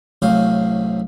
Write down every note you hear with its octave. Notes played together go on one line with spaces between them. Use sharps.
C2 F#2 A2 C5 F5